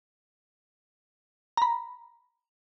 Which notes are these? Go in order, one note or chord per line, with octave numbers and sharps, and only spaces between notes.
A#5 B5